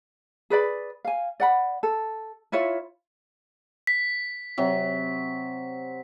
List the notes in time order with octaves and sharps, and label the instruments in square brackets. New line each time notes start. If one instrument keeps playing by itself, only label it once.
[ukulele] G#4 B4 D5 B5
F5 G#5
D5 F#5 B5
A4
E4 F4 C#5 E5
[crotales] B6
[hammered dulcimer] C3 F#3